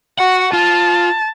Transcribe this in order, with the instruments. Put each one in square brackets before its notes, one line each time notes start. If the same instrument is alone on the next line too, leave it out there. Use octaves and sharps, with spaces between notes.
[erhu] F#4 [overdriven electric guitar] F#5
[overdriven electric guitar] F4 [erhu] A5